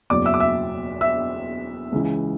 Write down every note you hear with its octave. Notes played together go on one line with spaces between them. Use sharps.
F#1 E2 B2 F#3 D5 D6
E5 E6
D6
E5 E6
E5 E6
C#2 C#3 E3